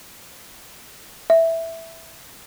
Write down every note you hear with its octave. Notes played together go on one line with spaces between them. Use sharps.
E5